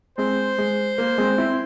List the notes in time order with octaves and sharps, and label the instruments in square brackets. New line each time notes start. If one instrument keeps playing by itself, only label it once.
[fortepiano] G#3 C4 [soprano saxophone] C5
[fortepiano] G#3
A#3
G#3 C4
C4 E4